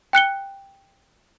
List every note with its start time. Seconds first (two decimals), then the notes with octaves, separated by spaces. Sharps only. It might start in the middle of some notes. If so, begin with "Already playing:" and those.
0.13 G5 F#6 C#7 G7